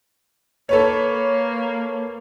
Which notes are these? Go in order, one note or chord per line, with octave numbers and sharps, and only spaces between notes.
A#3 A4 B4 C#5